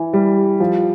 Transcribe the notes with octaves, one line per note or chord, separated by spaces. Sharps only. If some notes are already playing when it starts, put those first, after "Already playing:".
Already playing: E3
G3
F3